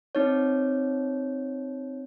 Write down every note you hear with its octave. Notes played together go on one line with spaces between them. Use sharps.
C4 D#4 C#5